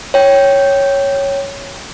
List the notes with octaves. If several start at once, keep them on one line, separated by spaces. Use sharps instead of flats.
C#5 G5